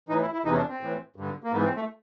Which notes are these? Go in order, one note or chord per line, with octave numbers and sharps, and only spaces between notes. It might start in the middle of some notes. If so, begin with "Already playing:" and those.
A2 E3 D#4
E4
E4
E2 C3 E3 D#4
C#4
D4
C4
A2 E3
G2 D3
A#3
G#2 E3 B3
C4
A3